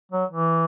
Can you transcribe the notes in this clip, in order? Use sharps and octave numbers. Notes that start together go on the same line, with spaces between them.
F#3
E3